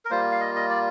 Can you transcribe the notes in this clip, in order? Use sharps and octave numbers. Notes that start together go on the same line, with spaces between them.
A#4
G3 A#3 F4 C5
F5
D#5
D#5
D5